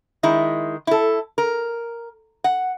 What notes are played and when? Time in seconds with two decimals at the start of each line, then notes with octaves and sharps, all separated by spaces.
0.23 D#3 G#3 E4
0.87 E4 A4
1.38 A#4
2.44 F#5